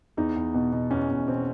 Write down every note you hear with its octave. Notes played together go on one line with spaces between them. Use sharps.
E2 D#4
E2
B2
B2
E2 C#4
E2
B2 C4